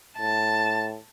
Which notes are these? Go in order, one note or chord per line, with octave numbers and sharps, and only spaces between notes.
A2 A5